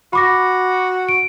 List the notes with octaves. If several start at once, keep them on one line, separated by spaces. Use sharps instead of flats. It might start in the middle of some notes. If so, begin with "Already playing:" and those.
F#4 B5 D6 A#6
D7